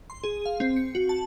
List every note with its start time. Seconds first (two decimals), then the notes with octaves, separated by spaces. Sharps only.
0.10 C6
0.24 G#4
0.46 F5
0.60 C4
0.76 C#7
0.95 F#4
1.09 A5